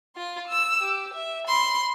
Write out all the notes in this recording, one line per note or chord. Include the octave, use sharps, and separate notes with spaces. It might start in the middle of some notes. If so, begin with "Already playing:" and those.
F4 C6
E6
G4
E5
B5 C6